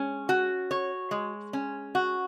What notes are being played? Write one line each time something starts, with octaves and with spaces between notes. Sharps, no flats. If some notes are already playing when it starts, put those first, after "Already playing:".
Already playing: G#3 C#4
F#4
C#5
G#3
C#4
F#4